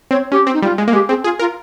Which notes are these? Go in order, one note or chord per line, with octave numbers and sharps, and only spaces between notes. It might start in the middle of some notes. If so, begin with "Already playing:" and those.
C4 C#5
C#4 G4
C4
D#4
G3 F4
G#3
A#3
G#3 G4
C4 G#4
F4 G#4
F4 A#4